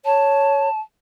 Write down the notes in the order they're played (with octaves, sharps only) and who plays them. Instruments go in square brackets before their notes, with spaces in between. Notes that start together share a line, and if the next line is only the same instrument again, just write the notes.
[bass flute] C#5 [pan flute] A5